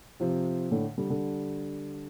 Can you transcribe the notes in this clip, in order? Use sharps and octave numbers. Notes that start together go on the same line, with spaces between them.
C3 F3
A2 D3
D3 G3
D3 G3